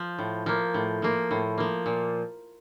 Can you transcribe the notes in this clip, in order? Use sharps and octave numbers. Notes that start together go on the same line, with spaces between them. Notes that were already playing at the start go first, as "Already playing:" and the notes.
Already playing: F3
A2
F3 A#3
A2
F3 A#3
A2
F3 A#3
A#2